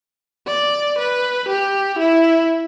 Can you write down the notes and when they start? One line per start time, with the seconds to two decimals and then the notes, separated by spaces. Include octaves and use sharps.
0.48 D5
0.99 B4
1.49 G4
1.99 E4